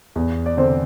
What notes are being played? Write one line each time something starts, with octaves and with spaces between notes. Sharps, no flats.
E2
D5
D3 C4 C5